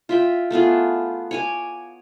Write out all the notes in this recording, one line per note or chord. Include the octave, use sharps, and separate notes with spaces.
F4 E5 G5
A3 B3 F4 G#4
C#5 G#5 D6